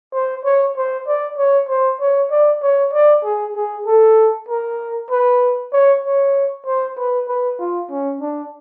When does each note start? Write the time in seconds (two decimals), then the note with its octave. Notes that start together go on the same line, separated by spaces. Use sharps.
0.13 C5
0.45 C#5
0.76 C5
1.07 D5
1.38 C#5
1.69 C5
2.01 C#5
2.31 D5
2.62 C#5
2.93 D5
3.24 G#4
3.56 G#4
3.86 A4
4.49 A#4
5.10 B4
5.73 C#5
6.04 C#5
6.66 C5
6.98 B4
7.28 B4
7.59 F4
7.90 C#4
8.21 D4